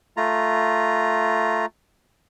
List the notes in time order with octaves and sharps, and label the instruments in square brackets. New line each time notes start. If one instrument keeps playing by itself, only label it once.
[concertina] A3 F4 A#5